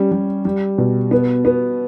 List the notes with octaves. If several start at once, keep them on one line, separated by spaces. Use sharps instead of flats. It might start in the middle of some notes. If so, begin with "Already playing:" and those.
Already playing: G3 C#4
G3
G3
B2
B3
B3